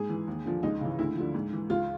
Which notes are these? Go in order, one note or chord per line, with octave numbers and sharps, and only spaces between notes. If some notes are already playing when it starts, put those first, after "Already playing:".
Already playing: G#2 G#4
E3
D#2
D3 F3
C#2 D#4
C#3 E3
D2 E4
D3 F3
G#2
E3
C#2 F4